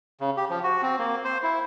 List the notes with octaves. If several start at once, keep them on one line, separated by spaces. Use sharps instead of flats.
C#3
G4
F3
F#4
C4
A#3
C5
E4